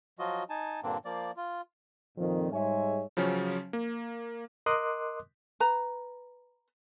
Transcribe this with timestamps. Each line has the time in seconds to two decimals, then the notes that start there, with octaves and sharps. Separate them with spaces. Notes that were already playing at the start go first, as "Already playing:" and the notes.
0.19 F3 F#3 F4 F#4 D#5
0.50 D#4 G#5 A5
0.83 G2 A#2 D3 A#3 C4 D4
1.05 F3 A#3 D5
1.37 F4
2.17 F2 A#2 D#3
2.52 G#2 G3 G#3 C#5 E5 G#5
3.17 C#3 F3 F#3 C#4
3.73 A#3
4.66 A#4 D#5 C6 D6 D#6 F#6
5.60 B4 A#5